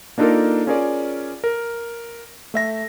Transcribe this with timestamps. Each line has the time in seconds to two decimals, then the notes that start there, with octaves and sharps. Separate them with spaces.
0.18 A#3 D4 D#4 F4 A4 A#4
0.67 C#4 F4 G#4 A#4 C#5 D5
1.44 A#4
2.54 A3 E5 A#6